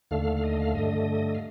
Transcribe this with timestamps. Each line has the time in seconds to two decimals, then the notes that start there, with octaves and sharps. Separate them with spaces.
0.11 D#2 D3 A3 F5
0.37 F5
0.44 D#5
0.60 F5
0.75 G2 D3 A3 D#5
1.35 F5